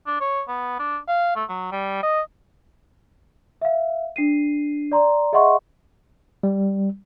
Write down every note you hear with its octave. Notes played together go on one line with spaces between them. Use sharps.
D4
C#5
B3
D4
F5
A3
F#3
G3
D#5
E5 F5
D4 C7 D#7
D5 A#5 C6
G#4 D#5 E5 F#5 C6 C#6
G3